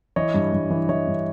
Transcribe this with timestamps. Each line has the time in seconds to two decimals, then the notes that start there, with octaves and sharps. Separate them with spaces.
0.16 E3 C#5 D#5
0.34 G2
0.53 G2
0.70 E3
0.89 E3 C#5 D#5
1.07 G2